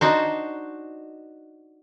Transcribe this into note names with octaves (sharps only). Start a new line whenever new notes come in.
D4 D#4 F#4 C5